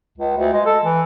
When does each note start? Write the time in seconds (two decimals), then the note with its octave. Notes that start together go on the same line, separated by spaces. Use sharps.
0.18 C#2
0.38 D2
0.53 G#3
0.66 A4
0.84 E3